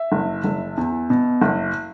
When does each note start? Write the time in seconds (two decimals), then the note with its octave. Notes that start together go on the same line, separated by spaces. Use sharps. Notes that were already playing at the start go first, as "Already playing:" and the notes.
Already playing: E5
0.12 F#1
0.44 F#1
0.77 E2
1.10 B2
1.41 F#1